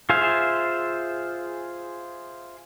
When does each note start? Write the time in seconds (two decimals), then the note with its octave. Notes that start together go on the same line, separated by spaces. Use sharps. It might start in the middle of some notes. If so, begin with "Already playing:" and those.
0.10 F4 G#4 C5 E5 F5